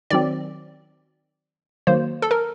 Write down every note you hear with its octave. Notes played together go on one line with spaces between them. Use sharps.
D#3 F#3 C4 D5
D#3 F#3 A#3 C5
A4
A#4